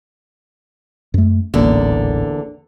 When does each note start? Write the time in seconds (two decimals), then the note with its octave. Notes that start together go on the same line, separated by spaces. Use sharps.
1.14 F#2 A3
1.54 D#1 A1 E2 D3 A#3